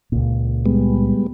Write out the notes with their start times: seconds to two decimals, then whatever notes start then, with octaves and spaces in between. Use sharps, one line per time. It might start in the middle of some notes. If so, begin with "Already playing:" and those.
0.12 C#2 A#2
0.66 G3 G#3 B3